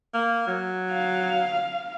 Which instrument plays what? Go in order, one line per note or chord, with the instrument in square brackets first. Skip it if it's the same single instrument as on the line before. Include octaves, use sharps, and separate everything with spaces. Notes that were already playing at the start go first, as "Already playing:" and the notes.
[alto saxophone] A#3
F#3
[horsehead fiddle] F5